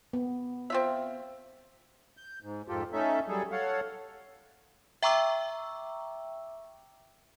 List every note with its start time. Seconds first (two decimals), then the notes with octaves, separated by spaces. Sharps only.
0.13 B3
0.70 C4 F4 E5
2.17 G6
2.43 G#2
2.68 F2 G#2 F4 G4 A4
2.93 A3 C#4 D#4 A4 E5
3.29 F#3 G3 G#4 A4
3.52 A4 C#5 F5 F#5
5.03 E5 G5 A#5 C#6 D6 E6